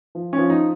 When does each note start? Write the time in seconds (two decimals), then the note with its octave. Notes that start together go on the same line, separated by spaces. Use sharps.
0.15 F3
0.33 C#4
0.38 F3
0.50 D#4